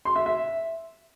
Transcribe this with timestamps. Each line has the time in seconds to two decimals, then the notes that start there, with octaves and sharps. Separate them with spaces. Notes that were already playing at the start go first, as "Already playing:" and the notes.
0.05 C6
0.16 E5
0.26 E5